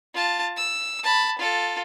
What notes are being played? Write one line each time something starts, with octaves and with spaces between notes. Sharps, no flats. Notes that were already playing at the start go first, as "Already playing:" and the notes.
F4 A5
E6
A5 B5
F4 A4